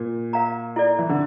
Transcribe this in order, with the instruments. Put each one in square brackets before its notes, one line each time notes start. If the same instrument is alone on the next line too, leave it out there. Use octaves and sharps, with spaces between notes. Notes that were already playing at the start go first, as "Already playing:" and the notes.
Already playing: [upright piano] A#2
[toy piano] A#4 F5 A#5
E4 A4 D5
[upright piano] E3
D3